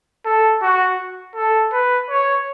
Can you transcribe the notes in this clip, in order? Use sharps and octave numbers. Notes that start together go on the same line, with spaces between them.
A4
F#4
A4
B4
C#5